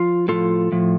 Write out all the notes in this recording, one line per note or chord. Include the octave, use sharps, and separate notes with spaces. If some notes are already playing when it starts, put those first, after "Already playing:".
Already playing: F3 F4
A2 F3 F4 A4
A2 F3